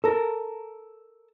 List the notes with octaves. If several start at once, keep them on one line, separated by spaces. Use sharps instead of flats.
A4 A#4